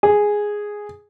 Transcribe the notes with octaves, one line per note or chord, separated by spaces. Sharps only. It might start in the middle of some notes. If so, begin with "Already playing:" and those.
G#4